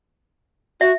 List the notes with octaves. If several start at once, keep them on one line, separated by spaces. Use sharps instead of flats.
F#4 E5